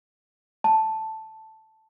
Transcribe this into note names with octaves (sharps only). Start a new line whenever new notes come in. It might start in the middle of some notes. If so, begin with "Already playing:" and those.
A5